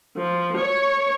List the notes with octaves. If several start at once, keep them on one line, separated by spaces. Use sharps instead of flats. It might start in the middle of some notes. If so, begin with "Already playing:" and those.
F3
C#5